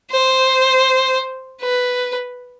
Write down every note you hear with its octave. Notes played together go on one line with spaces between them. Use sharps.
C5
B4